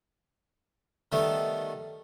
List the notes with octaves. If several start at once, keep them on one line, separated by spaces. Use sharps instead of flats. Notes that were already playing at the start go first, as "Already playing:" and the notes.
D#3 G3 A3 B3